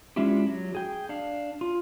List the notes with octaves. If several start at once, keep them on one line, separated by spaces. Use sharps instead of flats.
G#3 C#4 D4 E4 F4 G4
F#3
G#4 G5
D4 F5
F4